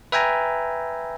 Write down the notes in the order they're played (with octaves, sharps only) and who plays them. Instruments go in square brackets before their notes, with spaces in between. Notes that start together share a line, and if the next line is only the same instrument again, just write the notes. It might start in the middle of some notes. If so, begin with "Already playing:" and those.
[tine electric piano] B4 E5 G5 G#5 A#5